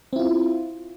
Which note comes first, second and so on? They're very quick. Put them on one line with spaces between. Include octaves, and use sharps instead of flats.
C4 E4 F4